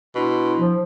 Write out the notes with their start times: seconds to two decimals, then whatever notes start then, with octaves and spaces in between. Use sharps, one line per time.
0.15 B2 D4 E4 C6
0.58 F3